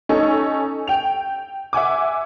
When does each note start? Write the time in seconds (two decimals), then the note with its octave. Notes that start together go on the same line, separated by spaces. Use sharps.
0.09 C#4 D#4 A4
0.87 G5 F7
1.73 E5 F#5 G#5 D6